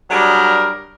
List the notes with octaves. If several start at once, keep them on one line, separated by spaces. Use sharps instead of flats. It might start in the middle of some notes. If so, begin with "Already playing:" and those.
F#3 G3 D4 G#4 A#4